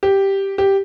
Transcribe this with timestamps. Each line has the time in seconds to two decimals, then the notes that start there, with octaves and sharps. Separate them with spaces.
0.03 G4
0.58 G4